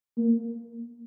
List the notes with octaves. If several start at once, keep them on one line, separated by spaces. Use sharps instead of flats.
A#3